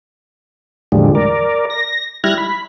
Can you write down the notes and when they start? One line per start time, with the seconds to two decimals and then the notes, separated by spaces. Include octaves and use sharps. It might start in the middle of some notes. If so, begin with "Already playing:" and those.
0.92 E2 A2 D3 F3 G3 G#3
1.15 A#4 D5
1.70 A#6
2.24 G3 E4 F6 F#6 G#6 A#6
2.38 B5